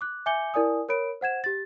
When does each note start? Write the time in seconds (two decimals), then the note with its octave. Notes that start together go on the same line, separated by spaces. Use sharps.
0.01 D6 F#6
0.26 E5 G#5 D6 G6 C#7 G7
0.54 E4 A#4 D5 G#5 D#6
0.89 A#4 C#5 B5 D7
1.21 C5 F#5 G#6 E7
1.44 G4 A6